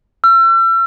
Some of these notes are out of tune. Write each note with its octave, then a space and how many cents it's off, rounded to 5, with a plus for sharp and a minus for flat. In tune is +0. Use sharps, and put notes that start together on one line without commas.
E6 +40